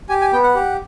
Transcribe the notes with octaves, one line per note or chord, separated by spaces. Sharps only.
G4 G#5
G#5
B3 G5
F#5
G4